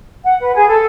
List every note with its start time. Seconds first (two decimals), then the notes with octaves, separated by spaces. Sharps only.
0.23 F#5
0.40 B4
0.55 G#4
0.69 A4